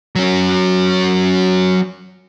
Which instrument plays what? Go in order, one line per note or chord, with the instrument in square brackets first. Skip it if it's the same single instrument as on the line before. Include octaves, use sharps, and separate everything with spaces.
[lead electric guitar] F#3 C#4